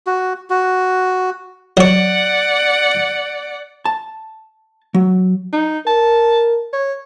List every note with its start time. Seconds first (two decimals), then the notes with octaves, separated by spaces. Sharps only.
0.07 F#4
0.50 F#4
1.77 F#3 C#5 D5 F#5
3.85 A5
4.94 F#3
5.53 D#4
5.87 A#4 A5
6.73 C#5